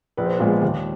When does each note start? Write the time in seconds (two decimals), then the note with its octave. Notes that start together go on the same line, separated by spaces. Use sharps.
0.17 A#1 B4
0.26 C5
0.34 B4
0.40 A#2 F3 G#3 B3
0.62 D#2